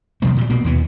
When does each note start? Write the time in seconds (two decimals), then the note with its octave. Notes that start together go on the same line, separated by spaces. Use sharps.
0.22 B2 F3 G3 A#3
0.37 A#2 G3
0.50 B2 A#3
0.64 D#2 E3 B3